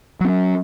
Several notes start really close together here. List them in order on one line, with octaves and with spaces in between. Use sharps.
F#3 C4 C#4